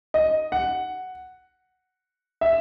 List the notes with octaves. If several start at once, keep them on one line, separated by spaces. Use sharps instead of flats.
D#5
F#5
E5